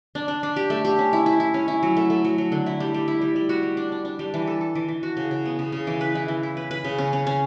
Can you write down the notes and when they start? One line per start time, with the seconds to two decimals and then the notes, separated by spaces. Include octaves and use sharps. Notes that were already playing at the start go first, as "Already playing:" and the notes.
0.15 D4
0.28 D4
0.43 D4
0.56 G4
0.70 A3
0.85 G4
0.99 C#4
1.13 E4
1.26 E4
1.40 E4
1.54 C#4
1.68 E4
1.83 F#3
1.97 A3
2.10 A3
2.25 F#3
2.38 F#3
2.52 D3
2.66 E4
2.80 G3
2.94 G3
3.08 E4
3.22 G3
3.36 G3
3.49 F#4
3.63 G3
3.77 D4
3.92 D4
4.05 D4
4.19 G3
4.34 E3
4.47 A4
4.61 A4
4.75 E3
4.89 E3
5.03 F#4
5.17 C#3
5.31 C#3
5.46 B3
5.59 C#3
5.72 C#3
5.87 E3
6.01 B4
6.15 E4
6.28 E3
6.43 E4
6.57 B4
6.71 B4
6.85 C#3
6.98 C#4
7.13 C#4
7.27 C#4